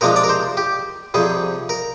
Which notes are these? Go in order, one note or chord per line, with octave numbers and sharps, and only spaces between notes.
C3 F3 G#3 D4 A#4
D5
A#4
C5
G4
F2 C3 G3 G#4
A#4